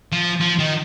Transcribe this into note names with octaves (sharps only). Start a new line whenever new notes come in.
F3
F3
D#3